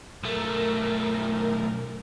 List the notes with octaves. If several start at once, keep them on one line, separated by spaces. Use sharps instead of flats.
B1 A3 A#4